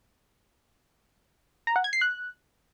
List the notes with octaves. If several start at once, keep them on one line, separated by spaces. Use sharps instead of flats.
A#5
F#5
G#6
C7
F#6